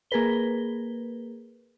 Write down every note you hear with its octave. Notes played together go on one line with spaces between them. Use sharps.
A#3 G#4 A#4 B4 G7